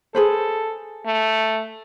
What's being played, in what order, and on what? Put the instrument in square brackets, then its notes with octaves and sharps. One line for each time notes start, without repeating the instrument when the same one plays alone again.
[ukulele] G#4 B4 C5 [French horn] A4
[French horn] A3